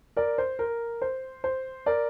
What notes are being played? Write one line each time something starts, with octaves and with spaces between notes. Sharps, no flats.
A#4 D5
C5
A#4
C5
C5
A#4 D5